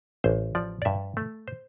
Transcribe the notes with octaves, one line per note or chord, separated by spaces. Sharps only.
A1 C5
F3 D5
D5
G2 E5
A3
C5